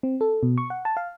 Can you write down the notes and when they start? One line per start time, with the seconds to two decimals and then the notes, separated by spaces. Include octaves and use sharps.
0.03 C4
0.21 A4
0.43 B2
0.58 C#6
0.70 F#5
0.85 A5
0.97 F5